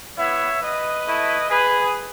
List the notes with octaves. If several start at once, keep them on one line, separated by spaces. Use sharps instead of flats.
B3 E4 C#5 E5
B4 D#5
A3 E4
G#4 B4